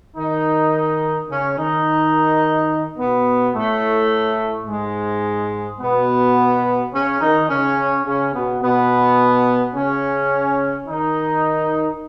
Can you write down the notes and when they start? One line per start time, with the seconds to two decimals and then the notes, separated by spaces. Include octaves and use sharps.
0.16 D#3 D#4
1.29 C#3 C#4
1.58 D#3 D#4
2.98 B2 B3
3.54 A2 A3
4.67 G#2 G#3
5.80 B2 B3
6.93 C#3 C#4
7.21 D#3 D#4
7.49 C#3 C#4
8.05 C#3 C#4
8.33 B2 B3
8.62 B2 B3
9.74 C#3 C#4
10.87 D#3 D#4